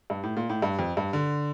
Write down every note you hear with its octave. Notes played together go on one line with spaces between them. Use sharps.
G2
A2
A#2
A2
G2
F2
G2
D3